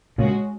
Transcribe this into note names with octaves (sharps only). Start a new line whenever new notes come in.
A#2 C#3 G#3 C#4 F#4